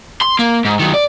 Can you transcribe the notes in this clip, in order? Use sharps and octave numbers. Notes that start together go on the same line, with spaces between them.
C6
A#3
G#2
D#3 F#3
D5